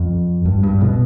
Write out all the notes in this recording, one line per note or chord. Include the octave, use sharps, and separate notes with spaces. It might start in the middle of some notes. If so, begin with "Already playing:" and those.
Already playing: F2
G2
G2
B2